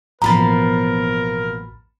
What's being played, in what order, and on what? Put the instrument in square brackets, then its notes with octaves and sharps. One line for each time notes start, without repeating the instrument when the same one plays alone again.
[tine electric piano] A1 B5 A6 [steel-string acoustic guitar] B2 F3 A#3 [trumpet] A#4 [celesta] A#5